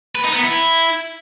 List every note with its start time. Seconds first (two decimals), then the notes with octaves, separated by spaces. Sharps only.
0.15 B4
0.25 D#4
0.34 B3
0.43 E4